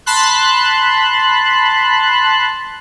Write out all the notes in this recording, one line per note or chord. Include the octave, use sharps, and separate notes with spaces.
A5 B5 C6 F#6